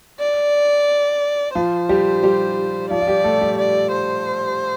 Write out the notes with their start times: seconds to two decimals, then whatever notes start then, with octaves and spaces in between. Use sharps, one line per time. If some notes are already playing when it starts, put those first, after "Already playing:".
0.20 D5
1.55 F3 F4 C5
1.89 G3 G4
2.23 G3 G4
2.90 F3 F4 D5
3.01 F4
3.07 G3 G4
3.24 A3 A4
3.41 G3 G4
3.58 D5
3.91 C5